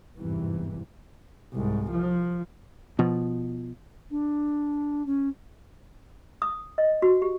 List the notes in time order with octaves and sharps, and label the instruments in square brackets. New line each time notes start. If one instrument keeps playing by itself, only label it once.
[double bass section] G#1 E2 G2 C3 E3
[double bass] C2 G#2
F3
[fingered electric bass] B2 F3
[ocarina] D4
C#4
[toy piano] D#6
D#5
F#4
G4